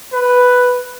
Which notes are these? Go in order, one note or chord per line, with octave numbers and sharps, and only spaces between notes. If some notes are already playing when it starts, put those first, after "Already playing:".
B4